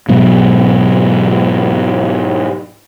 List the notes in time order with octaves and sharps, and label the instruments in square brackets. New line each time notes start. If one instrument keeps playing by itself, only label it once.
[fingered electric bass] G#2 B2 F#3